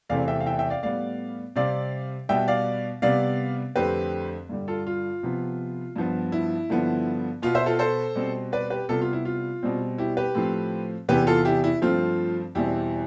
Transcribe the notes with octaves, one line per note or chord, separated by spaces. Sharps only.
E2 C3 E3 A3 C4 D5 F5
E5 G5
F5
E5 G5
E5 G5
D5 F5
A2 G3 B3 D5 F5
C3 G3 C4 D5 F5
B2 G3 B3 E5 G5
D5 F5
C3 G3 B3 D5 F5
F2 D3 A3 C4 G4 B4
G2 D3 G3
F4 A4
F4
C3 F3 B3
G2 F3 B3
E4
G2 D3 F3 B3
B2 B3 F4
C5 E5
F4 A4
A4 C5
B2 G3 C4
B4 D5
G4 B4
C3 G3 B3 F4 A4
F4
E4
F4
B2 G3 C4
E4 G4
G4 B4
A2 F3 C4
E2 C3 E3 B3 G4 B4
F4 A4
E4 G4
E4
G2 F3 A3 C4 F4
E2 B2 G3 C4 E4 G4